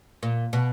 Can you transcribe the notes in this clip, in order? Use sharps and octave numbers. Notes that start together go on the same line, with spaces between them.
A#2
B2